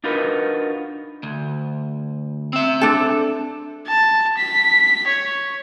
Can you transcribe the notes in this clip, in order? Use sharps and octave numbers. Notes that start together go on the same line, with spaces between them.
D4 D#4 F4 F#4 A#4 B4
D2
C4 E5
D4 A4
A5
B6
C#5